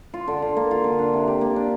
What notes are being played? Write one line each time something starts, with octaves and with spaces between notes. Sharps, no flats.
F4
D3
D3
A#3
F4
D3
D4
C3
G4
A#3
D4